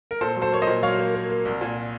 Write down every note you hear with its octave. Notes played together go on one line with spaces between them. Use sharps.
A#4
A#2 A4 C5
F#3
A4 C5
A#3 C#5
C5 D#5
A#2
F#3 C#5 F5
A#3
A#3
A#3
C2
A#2